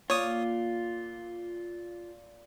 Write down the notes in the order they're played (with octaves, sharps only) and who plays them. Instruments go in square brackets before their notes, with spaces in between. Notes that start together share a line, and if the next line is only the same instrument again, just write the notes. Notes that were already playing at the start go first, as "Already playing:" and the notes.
[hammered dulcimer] A#2 D6 [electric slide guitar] F4 [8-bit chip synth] C#5 D#6